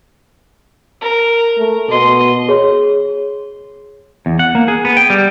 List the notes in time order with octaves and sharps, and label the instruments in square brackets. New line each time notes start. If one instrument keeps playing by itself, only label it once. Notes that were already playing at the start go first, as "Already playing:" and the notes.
[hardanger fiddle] A#4
[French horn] A3
[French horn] B2 [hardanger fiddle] D#5 C6
[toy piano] G#4 C#5 C6
[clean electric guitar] E2
F#5
A#3
G#4
B3
G5
G3